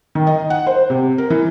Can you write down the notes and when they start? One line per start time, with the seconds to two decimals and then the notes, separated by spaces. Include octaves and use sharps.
0.15 D#3
0.27 D#5
0.50 F#5
0.67 C5
0.90 C3
1.18 A#4
1.30 E3